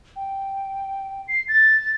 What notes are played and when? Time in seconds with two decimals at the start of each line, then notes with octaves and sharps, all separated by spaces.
0.16 G5
1.28 C7
1.48 A6